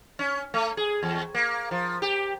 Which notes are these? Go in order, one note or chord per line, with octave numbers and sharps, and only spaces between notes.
C#4
A3
G#4
E2
A#3
F3
G4